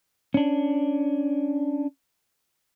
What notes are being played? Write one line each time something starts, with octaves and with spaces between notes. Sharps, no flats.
C#4 D4